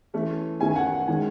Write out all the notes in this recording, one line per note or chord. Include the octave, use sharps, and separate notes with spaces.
E3 A3 C#4
D#3 A3 C#4 G#5
G#5
F#5
F#5
D#3 G#3 C#4 G#5